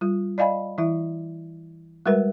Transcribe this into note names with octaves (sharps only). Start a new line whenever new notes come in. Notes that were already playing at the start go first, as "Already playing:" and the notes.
G3 F4
D5 D#5 F5 G#5 B5
E3 E4 E5
G3 G#3 F#4 A#4 B4 E5